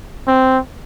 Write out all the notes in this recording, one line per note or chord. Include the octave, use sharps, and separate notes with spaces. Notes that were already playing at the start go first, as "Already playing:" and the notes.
C4